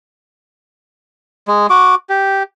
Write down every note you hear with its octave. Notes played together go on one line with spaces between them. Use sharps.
G#3
F#4 D6
G4